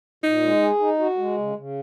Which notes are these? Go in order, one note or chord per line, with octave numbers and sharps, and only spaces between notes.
A#2 D#4
G#3
G#4
D#4
F#4
G#3
C#3
C#3